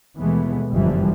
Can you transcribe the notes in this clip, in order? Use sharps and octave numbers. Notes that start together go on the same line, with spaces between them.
D#2 B2 E3 G#3 A3 B3
G1 F#2 E3 F3 G3